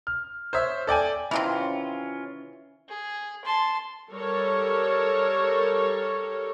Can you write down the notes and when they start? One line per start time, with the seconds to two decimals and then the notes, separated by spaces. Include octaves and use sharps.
0.07 F6
0.53 C5 C#5 E5
0.87 A4 D5 G5 G#5
1.31 C3 D#3 E3 C#4 F4
2.89 G#4
3.45 A5 C6
4.10 G3 A4 A#4 C#5